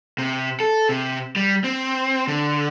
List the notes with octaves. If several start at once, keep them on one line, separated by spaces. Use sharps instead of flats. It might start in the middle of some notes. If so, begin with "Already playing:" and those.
C3
A4
C3
G3
C4
D3